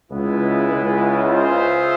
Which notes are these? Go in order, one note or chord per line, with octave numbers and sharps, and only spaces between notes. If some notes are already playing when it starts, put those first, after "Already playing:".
C#2 C#3 G#3 B3 E4
C#2 C#3
F4 G#4 C5 E5